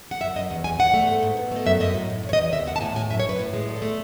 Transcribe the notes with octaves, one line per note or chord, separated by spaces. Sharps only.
F#5
F#2 E5
F#2 D#5
E2 F#5
E2 G#5
E2 F#5
A3
G#2
G#2
B2
A3 D#5
F#2 E5
F#2 D#5
A2
A2
E2
C#5
D#5
E2
D#2 E5
D#2 F#5
A5
A2 G#5
A2 G#5
F#2 E5
C#5
F#2 B4
A2
G#3
E2 A4
A3